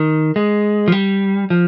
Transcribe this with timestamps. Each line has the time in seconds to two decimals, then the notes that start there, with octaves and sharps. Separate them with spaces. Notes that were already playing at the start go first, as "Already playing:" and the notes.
Already playing: D#3
0.36 G#3
0.88 F3
0.92 G3
1.50 F3